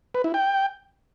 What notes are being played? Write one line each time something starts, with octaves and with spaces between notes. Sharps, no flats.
B4
E4
G5